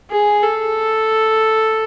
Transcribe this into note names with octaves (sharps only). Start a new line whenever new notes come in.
G#4
A4